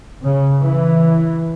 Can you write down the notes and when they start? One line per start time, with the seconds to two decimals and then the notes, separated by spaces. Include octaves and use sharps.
0.23 C#3
0.62 E3